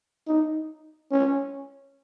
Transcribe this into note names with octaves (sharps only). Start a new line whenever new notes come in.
D#4
C#4